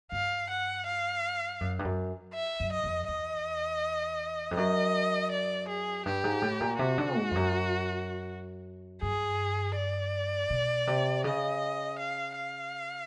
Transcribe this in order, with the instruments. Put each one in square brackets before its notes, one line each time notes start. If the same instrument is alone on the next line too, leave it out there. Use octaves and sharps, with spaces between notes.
[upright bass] G2 [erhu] F5
[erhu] F#5
F5
[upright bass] F#2
G2
F#2
[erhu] E5
[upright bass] F#2
[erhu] D#5
[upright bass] F2
[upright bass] E2 [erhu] D#5
[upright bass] F2
[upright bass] F#2 [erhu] D#5
[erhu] D5
G#4
[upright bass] G2 [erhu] G4
[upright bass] G#2
A2
A#2
[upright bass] C3 [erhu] F#4
[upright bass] D3
G#2
F2
F#2
[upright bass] G2 [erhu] G#4
[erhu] D5
[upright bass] B2
C3
[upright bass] C#3 [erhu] D#5
[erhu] F5
F5